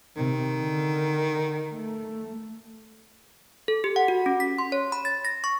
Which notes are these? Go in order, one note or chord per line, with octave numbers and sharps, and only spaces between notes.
C3 D#3
D3
A3
A4
G4
F#5
F#4
C#4
B6
C6
C#5
B5
A6
A#6
C#6